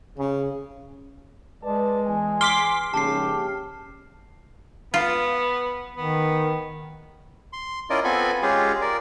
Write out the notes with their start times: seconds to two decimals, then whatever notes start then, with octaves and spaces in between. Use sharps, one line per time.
0.18 C#3
1.64 G#3 B4 D5 A5
2.07 E2 G#5
2.41 C6 D6 F6 B6
2.94 A#1 G#2 C#3 G4 A5 C7
4.94 B3 F4
5.97 D#3 B3
7.53 C6
7.90 C#4 E4 F4 A#4 D5 D#5
8.04 B3 C4 F4 A4 G#5 B5
8.42 G#3 C#4 F4 G4 G#4
8.81 A#4 D5